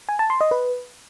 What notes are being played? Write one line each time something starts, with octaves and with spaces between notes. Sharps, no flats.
G#5
A5
C6
D#5
B4